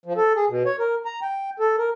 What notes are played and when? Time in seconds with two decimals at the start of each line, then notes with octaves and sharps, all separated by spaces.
0.06 F3
0.17 A4
0.36 G#4
0.49 B2
0.66 C#5
0.79 A#4
1.05 A#5
1.22 G5
1.60 A4
1.78 A#4